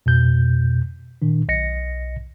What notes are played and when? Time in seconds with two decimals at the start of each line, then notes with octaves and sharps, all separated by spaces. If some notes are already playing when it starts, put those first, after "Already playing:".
0.06 F2 B2 G6
1.22 A#2 D#3 D4
1.48 B1 D#5 A#6 C#7